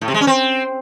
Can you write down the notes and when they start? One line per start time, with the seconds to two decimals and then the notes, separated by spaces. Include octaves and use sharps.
0.01 A2
0.08 C3
0.14 G#3
0.21 C#4
0.27 C4